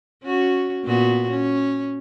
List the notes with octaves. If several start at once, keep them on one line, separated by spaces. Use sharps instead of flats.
C#4 F#4
A#2 B3 F#4
C#4